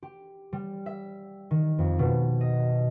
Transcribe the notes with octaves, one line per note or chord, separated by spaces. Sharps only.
G4
G3
E5
D#3
F2
B2
D#5